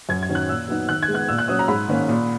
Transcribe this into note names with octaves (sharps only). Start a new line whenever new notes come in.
F#2 G#6
G#6
D#3 F#3 C#4
F#6
A#2 E6
F#3 B3 D#4
D#3 F#6
G#6
G#3
B3 F#6
A#2 E6
F#6
F#3 C#4 D#6
A#5
G#2 B5
D#3 A#3 C#4
A#2